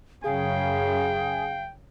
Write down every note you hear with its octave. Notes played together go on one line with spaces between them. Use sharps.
F#2 C#3 G#4 F5 G5